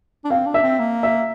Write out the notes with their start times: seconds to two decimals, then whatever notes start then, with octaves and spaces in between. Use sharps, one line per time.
0.25 D4
0.30 C4 F5
0.46 D4
0.54 E5
0.63 C4
0.79 A#3
1.03 E5